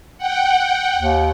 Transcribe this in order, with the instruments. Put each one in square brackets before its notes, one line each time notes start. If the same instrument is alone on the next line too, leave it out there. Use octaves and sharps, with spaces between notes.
[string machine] F#5 G5
[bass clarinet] D#2